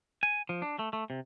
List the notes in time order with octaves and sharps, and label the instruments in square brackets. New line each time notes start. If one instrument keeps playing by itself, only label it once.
[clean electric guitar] G#5
F3
D4
A3
A3
C3